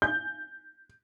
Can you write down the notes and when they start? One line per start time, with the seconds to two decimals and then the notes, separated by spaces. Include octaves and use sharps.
0.02 G6